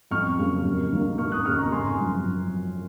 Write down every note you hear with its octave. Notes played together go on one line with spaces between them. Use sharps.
F2 C#6 F6
C#3 F#3 A#3
D#2
D#3 A#3
F1 C#6 F6
D#6 F#6
D#2 C#3 C#6 F6
A#5 C#6
G#1 G#5 C6
F#2 F3